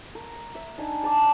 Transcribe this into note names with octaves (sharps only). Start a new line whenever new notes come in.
A#4
E5
D4 D#4 G#5
F5 A5 A#5 D6